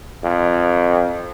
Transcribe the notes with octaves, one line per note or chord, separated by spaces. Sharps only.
F2